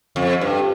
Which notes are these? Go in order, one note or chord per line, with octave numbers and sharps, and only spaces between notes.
F2
G2